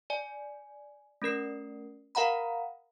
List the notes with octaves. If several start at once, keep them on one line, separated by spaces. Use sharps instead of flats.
D5 G#5
A3 C#4 A#4 C7
A#4 F5 F#5 A#5 B5